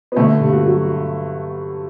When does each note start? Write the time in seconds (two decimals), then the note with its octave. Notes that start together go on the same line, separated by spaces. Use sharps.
0.12 B3
0.16 D3 A3
0.40 G2
0.52 F#4
0.63 F#3